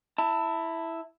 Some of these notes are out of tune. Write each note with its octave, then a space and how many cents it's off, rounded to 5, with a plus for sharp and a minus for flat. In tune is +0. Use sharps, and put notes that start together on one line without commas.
E4 +0 A5 +30